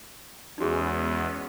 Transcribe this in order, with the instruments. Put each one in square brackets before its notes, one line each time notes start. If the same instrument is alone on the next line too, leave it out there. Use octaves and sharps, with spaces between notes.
[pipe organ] E2 [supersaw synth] G#3 B3 C#4 [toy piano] D#4 F#4 G#4